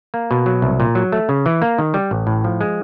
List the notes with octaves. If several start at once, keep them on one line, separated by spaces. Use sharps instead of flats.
A#3
B2
F#3
C2
A#2
F#3
A3
C#3
E3
A#3
D#3
G3
A1
A2
F3
G#3